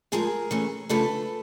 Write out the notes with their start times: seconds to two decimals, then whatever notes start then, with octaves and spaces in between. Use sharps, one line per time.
0.12 A2 F3 G#3 G#4 A#4
0.51 E3 A3 C#4
0.89 C#3 F3 A3 D4 A4 B4